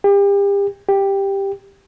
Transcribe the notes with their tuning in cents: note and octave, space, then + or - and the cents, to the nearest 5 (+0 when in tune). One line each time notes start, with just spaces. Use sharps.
G4 +35
G4 +5